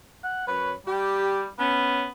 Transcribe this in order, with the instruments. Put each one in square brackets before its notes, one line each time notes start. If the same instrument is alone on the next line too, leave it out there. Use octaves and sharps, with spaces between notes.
[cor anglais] F#5
[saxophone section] F#2 C#5 [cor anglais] B4
[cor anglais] G3 [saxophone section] G4
[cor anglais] B3 [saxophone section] C#4